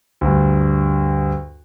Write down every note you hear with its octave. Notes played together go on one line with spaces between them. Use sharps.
D2 G2